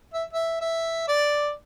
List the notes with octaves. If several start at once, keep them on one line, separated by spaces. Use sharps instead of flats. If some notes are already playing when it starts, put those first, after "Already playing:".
E5
E5
E5
D5